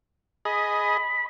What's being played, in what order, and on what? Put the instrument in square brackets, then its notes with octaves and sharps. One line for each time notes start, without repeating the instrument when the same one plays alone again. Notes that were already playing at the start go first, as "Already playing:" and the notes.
[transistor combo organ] G#4 D#5 [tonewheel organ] B5